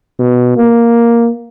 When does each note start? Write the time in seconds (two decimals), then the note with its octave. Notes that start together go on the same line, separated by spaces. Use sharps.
0.19 B2
0.57 A#3